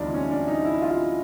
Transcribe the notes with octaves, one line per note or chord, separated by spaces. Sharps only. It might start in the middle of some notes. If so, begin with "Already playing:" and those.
Already playing: D2 C3 E3 G3 D4 D#4 F4
C#4
D4
D#4
E4
F4